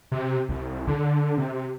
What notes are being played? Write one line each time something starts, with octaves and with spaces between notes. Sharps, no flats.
C3
C2
D3
C3